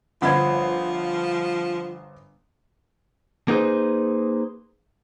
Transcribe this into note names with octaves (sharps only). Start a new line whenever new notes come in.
G1 F3 C5 F#5 B5 G#6
A#3 B3 D#4 G#4 B4 C5